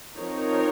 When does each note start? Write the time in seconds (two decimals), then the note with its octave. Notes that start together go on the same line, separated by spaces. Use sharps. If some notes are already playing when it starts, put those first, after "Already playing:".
0.16 F3 C4 D#4 A#4 C#5